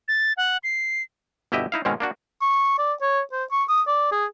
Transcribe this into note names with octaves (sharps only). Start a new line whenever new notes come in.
A6
F#5
C7
G1 B2 E4 G4 D#5 E5
D#4 E4 F5
G#2 B2 D#3 G#3 C4 C#4
A#3 D4 F#4
C#6
D5
C#5
C5
C#6
D#6
D5
G#4